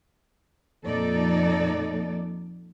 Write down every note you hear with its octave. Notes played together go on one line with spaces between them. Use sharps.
F2 A#2 D#4 A4 D5